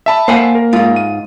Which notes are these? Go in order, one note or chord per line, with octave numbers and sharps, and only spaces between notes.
E5 A5 B5
A#3 C5 F#5 G#5
A#4
G#2 F4
D#7